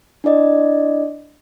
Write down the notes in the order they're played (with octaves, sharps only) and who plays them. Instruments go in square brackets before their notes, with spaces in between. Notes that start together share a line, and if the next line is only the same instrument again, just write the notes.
[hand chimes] D4 E4 D5 D#5